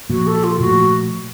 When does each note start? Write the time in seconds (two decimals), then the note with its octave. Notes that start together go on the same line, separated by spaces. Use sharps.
0.09 A#2 F3 A#3 F#4
0.27 A4
0.44 F4
0.60 A#2 F3 A3 F#4